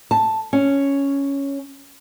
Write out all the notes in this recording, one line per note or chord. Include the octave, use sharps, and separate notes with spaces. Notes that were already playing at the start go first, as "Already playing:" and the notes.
A5
C#4